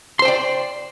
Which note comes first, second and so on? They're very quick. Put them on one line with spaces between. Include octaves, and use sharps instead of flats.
C6 C5 G5 D5